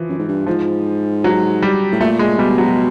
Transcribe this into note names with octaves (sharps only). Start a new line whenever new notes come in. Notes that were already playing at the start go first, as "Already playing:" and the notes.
Already playing: E3 F3
F#2
G#2
G2
G#2 F3
F#3
G3
A2
A#2 A3
G#3
B2 G3
F#3